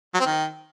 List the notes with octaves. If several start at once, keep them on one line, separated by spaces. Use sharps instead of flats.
F#3
C4
D#3